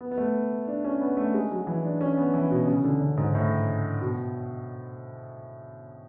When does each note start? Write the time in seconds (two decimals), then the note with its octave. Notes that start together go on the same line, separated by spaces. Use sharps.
0.01 B3
0.12 B3
0.18 A3
0.67 D4
0.85 C#4
1.01 B3
1.17 A3
1.34 G#3
1.51 F#3
1.67 E3
1.84 D4
2.01 C#4
2.17 B3
2.34 E3
2.51 B2
2.67 C#3
2.84 D3
3.01 C#3
3.17 G#2
3.35 A2
4.01 B2